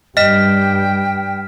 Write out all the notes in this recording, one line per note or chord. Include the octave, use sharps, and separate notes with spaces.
G2 G3 D#5 G5 F6 B6 E7